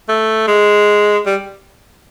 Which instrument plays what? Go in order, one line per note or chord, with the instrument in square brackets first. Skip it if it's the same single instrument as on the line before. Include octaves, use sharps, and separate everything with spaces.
[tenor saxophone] A3
G#3
G3